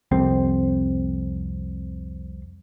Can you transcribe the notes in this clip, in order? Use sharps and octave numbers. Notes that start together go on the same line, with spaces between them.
C2 F2 C4